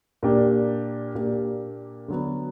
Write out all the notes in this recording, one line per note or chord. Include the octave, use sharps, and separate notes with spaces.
A#2 A#3 D4 G4
A#2 A#3 D4 G4
D3 F#3 B3